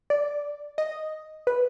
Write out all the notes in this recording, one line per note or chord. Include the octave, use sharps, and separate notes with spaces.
D5
D#5
B4